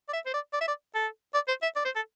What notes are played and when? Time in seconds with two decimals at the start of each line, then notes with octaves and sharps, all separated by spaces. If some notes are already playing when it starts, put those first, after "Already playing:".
0.09 D5
0.13 E5
0.26 C5
0.33 D5
0.53 D5
0.61 E5
0.68 D5
0.95 A4
1.34 D5
1.48 C5
1.63 E5
1.76 D5
1.85 C5
1.95 A4